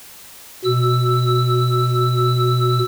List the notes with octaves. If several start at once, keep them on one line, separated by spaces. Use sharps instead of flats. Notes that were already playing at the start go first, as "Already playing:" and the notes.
B2 E6